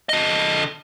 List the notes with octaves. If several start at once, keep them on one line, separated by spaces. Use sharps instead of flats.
D3 D#5